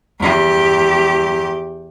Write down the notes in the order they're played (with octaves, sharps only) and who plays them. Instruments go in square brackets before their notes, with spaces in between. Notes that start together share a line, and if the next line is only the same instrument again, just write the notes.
[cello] E2 G4